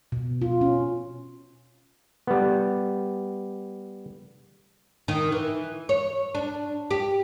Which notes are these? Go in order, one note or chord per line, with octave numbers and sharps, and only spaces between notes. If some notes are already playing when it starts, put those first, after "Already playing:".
B2
F4
C#4
G3 B3
D#3
E3
C#5
D4
G4